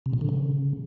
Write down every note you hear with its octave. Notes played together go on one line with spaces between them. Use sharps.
C3
A#2
D3
C#3